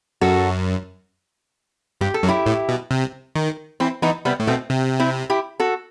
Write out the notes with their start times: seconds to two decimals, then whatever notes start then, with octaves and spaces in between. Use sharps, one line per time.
0.21 F#2 F#4 A4
2.01 G2 G4
2.14 A4
2.23 F#2
2.28 E4 G4
2.46 A2
2.69 B2
2.91 C3
3.36 D#3
3.80 E3 C4 E4
4.02 E3 B3 D#4
4.25 C3 G3 B3
4.40 A2
4.47 B2 A3 C4
4.70 C3
5.00 C4 E4
5.30 E4 G4
5.60 F#4 A4